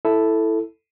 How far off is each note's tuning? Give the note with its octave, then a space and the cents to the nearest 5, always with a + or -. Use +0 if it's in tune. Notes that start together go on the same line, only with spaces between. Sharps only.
E4 +0 A4 +0